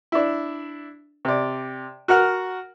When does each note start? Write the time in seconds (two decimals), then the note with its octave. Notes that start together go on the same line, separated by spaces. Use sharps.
0.12 D4 E4
1.25 C3 D5
2.08 F#4 A#4 F#5 F6